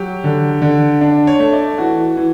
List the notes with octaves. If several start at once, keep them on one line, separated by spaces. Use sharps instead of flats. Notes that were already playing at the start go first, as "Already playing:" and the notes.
Already playing: F#3 G4
D3
D3
D4
C#5
A3
D5
E3 F#4
E3